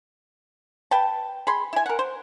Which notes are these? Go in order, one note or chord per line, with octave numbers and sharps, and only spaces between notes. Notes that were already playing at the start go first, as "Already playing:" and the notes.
B4 G5 A5
G#4 B5 C6
E4 G#5
A#4 F#5
C5